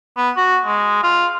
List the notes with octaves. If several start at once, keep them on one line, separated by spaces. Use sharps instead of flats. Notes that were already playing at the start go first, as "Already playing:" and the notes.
B3
F#4
G#3
F4